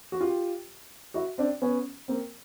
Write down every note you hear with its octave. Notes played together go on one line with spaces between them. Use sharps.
F#4
F4 G4
E4 F#4
C4 D4
B3 C#4
A#3 C4